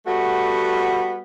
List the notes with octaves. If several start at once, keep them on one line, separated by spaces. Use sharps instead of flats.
G3 A3 B3 F#4